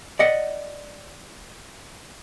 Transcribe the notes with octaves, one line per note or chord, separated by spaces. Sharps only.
D5 D#5 F#5